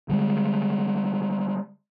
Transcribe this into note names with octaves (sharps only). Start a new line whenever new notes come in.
D3 G3 G#3